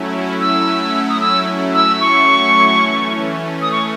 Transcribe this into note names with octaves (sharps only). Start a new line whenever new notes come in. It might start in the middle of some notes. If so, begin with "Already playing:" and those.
Already playing: F#3 A3 C#4 E4
E6
D#6
E6
E6
C#6
E3 A3 C#4
D#6
C#6